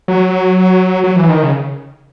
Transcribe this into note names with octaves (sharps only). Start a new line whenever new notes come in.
F#3
F#3
E3
D#3
C#3